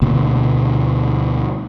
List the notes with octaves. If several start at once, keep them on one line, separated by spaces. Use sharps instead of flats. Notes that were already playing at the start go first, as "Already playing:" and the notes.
D2 B2 A#3